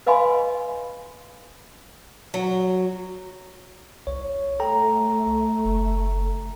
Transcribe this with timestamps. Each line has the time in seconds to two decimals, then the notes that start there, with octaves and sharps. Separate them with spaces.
0.07 B4 D#5 F5 G#5 B5 C6
2.34 F#3
4.07 C2 C#5
4.60 A3 A4 G5 A#5
5.65 F#1